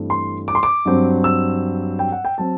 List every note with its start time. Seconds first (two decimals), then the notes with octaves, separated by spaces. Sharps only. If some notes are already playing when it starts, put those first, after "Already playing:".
Already playing: G2 E3 A3 C4
0.10 C6
0.48 D6
0.55 C6
0.63 D6
0.85 G2 F#3 C4
1.24 E6
1.99 G5
2.12 F#5
2.25 G5
2.38 F#3 C4 A5